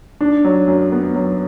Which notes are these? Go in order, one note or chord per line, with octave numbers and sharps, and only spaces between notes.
D4
F#3
F#2
B3
F#3